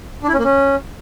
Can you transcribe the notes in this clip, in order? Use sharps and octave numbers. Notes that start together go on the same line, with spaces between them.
D4
E4
C#4
A#3
C#4